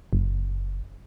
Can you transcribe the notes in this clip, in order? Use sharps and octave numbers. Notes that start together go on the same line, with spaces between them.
F#1